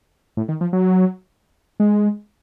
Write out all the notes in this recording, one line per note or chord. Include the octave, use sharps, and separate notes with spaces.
A2
D#3
F3
F#3
G#3